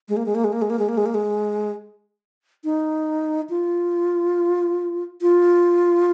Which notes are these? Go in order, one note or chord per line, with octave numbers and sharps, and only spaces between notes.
G#3
A#3
G#3
A#3
G#3
A#3
G#3
A#3
G#3
A#3
G#3
A#3
G#3
D#4
F4
F4